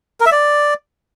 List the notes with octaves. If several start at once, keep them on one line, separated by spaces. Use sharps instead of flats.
A#4
E5
D5